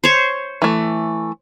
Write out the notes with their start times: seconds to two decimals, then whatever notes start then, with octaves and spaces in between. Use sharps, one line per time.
0.04 C5 C#5
0.62 E3 A3